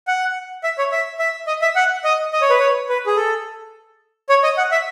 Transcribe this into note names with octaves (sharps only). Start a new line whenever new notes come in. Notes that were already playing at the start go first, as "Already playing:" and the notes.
F#5
E5
C#5
E5
E5
D#5
E5
F#5
D#5
D#5
C#5
B4
C#5
B4
G#4
A4
C#5
D#5
F#5
E5